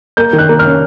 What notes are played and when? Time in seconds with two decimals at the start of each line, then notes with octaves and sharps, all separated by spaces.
0.17 A#3 G6
0.33 D#3
0.39 F#6
0.49 A#3
0.59 F6
0.65 C#4